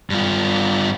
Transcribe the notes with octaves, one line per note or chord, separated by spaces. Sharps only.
G2 F4